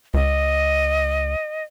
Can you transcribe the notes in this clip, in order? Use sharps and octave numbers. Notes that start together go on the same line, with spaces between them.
C#2 D#5